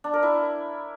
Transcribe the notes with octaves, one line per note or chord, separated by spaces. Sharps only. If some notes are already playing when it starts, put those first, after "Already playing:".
D4
A#4
E4